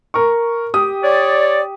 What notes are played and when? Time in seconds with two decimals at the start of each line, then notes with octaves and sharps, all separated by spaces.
0.14 A#4 C#6
0.74 G4 G5 D#6
1.03 C#5 D5